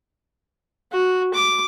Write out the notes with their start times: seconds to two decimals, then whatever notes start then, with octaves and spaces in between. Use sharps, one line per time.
0.92 F#4
1.34 D6